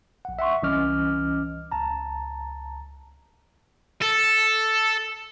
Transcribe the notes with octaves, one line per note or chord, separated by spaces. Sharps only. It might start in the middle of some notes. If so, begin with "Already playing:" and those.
A#1 F#5
E5 F#5 C6 C#6
C2 E3 C#4 D#5 D6 F6
C#2 A5 A#5
A4